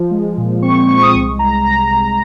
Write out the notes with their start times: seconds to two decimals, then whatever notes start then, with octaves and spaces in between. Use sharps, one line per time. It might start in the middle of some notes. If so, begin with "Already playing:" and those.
Already playing: F3
0.11 G#3
0.37 A#2
0.62 C4 C#6
0.88 G#3 C#6
1.03 D#6
1.13 C2 C#6
1.39 C2 A#5
1.65 C2 A#5
1.91 C2